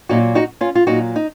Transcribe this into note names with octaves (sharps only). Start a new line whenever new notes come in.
A#2 F#3 D#4 F#4
D#4 F#4
C#4 F4
F4
A#2 F#3 D#4 F#4
D#4